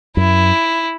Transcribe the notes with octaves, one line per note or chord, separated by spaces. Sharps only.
F#2 E4